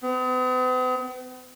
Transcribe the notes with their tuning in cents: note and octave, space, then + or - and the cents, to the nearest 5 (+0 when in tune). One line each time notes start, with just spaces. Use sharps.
B3 +45